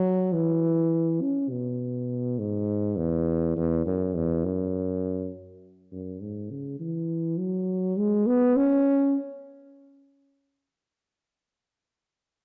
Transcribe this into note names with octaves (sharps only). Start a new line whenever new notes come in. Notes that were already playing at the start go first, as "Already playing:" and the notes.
Already playing: F#3
E3
C#4
B2
G#2
E2
E2
F#2
E2
F#2
F#2
G#2
C#3
E3
F#3
G#3
B3
C#4